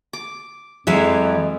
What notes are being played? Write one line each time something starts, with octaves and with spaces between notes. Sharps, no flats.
D6
F2 E3 F#3 G#3 E5 F5